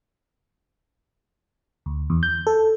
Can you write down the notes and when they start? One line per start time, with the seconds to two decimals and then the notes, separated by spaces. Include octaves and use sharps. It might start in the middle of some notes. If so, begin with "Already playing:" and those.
1.86 D2
2.10 E2
2.23 G6
2.47 A4